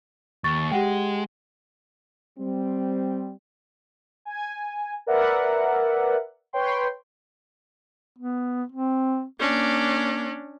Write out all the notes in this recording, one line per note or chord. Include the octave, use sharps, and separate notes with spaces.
D#2 C#6 A6
G#3 G4 F#5 G5
G3 C4
G#5
A#4 B4 D5 E5 F#5
B4 C#5 G5 C6
B3
C4
A#3 C#4 D4